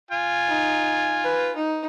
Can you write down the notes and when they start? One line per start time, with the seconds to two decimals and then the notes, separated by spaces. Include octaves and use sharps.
0.11 F4 G#5
0.48 D#4
1.24 B4
1.56 D#4